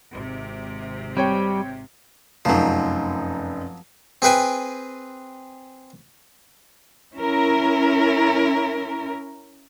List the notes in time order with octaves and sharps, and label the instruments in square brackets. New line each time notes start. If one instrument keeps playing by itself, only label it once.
[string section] G#1 C3
[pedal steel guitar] G3 [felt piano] C4 C#5 G5
[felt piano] F1 F#2 D#4 [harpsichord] F3 F#3
[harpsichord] C4 G#4 B4 G5 G#5
[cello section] C#4 E4 A#4